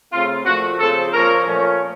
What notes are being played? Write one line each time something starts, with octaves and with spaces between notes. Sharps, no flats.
C#3 A3 C4 F4
A#2 F3 A3 F#4
C#3 F3 C4 A4
A#2 F3 A#3 C#4 A#4
A#2 F3 A3 C#4